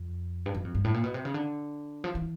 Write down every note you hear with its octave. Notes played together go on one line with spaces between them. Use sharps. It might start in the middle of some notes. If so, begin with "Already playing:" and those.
Already playing: F2
G2
F#2
F2
G2
A2
A#2
B2
C3
C#3
D3
F3
E3